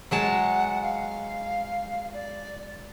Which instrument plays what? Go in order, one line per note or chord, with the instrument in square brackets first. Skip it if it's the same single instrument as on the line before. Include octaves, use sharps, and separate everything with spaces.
[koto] F#3 G#3 A5 [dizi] F#5
[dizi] F5
D5